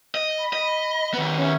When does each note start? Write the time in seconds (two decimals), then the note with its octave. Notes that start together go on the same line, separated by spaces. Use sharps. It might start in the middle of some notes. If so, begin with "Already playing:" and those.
0.15 D#5
0.38 B5
0.53 D#5
1.14 D#3 B3
1.38 C#4 C#5 E5